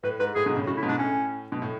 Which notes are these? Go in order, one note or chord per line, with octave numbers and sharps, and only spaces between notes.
A2 B4
G#2 B4
A2 G#4
G#2 B2
A2 C#3
A2 C#3 F#4
E4
G#2 B2
D4
A2 C#4
B2
A2